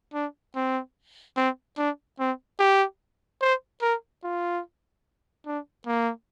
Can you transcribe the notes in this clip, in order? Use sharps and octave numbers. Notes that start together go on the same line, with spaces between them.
D4
C4
C4
D4
C4
G4
C5
A#4
F4
D4
A#3